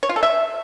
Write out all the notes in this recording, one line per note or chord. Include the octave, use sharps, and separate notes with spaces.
C#5
F4
A4
E5